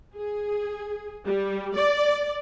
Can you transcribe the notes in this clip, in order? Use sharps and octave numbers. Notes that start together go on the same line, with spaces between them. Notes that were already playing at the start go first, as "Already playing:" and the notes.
G#4
G3
D5